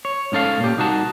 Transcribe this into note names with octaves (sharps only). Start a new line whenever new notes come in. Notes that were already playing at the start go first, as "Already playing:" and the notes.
C#5
G#2 C#4 A4 F5
A#2 G4
C2 D#4 F#4 A5